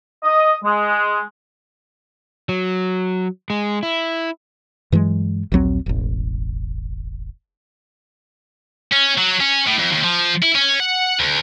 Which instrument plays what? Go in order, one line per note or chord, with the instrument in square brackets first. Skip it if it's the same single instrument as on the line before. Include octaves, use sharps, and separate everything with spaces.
[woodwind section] D#5
G#3
[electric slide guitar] F#3
G#3
E4
[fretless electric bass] G2 E3 F#3 G#3
A#1 D#2 F#3 C4
E1 A1
[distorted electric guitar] C#4
F#3
C#4
A2
F2
D#2
F3
E4
C#4
F#5
D2